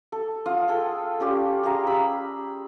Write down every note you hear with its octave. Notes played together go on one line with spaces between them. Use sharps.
A4
F4 F#5 D#6
G#4 A4 G5
C#4 F4 G4 D5
G4 G#4 F5 A#5
B5 E6